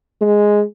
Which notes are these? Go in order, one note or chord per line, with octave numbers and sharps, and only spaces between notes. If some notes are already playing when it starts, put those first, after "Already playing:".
G#3